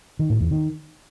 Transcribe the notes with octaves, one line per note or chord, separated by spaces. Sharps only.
D#3
A2
E2
D#3